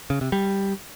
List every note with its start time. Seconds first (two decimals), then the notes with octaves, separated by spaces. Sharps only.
0.10 C#3
0.21 C3
0.32 G3